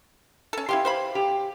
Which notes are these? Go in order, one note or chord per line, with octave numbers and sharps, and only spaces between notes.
C#4 A4
E4 G4 F5 C6
C5 F5 B5
G4